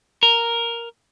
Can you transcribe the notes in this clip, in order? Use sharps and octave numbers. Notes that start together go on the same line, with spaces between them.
A#4